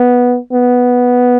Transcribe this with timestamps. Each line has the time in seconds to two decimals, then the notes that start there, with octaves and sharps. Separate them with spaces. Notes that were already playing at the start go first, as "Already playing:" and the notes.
Already playing: B3
0.53 B3